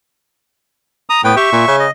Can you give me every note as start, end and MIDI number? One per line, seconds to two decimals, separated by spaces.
1.10 1.21 82
1.10 1.21 87
1.24 1.34 45
1.24 1.35 59
1.24 1.35 71
1.24 1.35 79
1.37 1.52 67
1.37 1.76 76
1.37 1.76 85
1.52 1.63 46
1.68 1.87 49
1.79 1.91 75